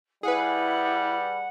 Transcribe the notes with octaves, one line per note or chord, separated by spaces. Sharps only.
G3 E4 G#4 B4 F#5